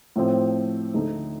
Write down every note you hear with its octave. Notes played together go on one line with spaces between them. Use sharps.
A2 F3 C4
D2 D3 A3 D#4 A4